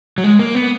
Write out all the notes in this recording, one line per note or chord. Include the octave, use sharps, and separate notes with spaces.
F#3
G#3
A#3
B3